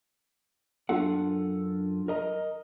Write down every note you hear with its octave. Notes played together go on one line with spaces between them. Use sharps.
F#2 D4 F4 A4 F#5
A#4 D#5 A#5